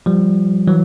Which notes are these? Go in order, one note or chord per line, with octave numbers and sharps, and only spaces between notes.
F3 G3
E3 F#3